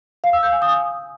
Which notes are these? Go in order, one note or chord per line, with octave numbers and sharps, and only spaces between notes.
F5
E6
G6
G#5
D#6